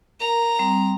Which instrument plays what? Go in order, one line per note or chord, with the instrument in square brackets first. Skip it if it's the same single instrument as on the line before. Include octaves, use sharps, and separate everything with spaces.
[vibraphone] A#4 [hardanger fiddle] A#5
[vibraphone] G3 C4